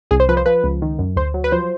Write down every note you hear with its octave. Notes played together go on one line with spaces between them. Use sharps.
C2 G#4
C5
F3 B4
C5
F3 B4
C#2
D#3
F#2
D2 C5
F#3
B4
F3 C5